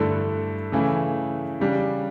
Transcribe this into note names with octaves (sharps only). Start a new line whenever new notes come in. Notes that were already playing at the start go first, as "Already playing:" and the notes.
Already playing: G2 D3 A3 E4 A4
C#3 E3 A3 E4
C#3 G3 D4